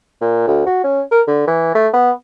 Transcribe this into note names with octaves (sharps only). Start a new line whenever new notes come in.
A#2
D2
F#4
C#4
A#4
D3
E3
A3
B3